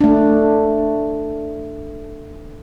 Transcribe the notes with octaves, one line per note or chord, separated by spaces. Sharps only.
A3 D4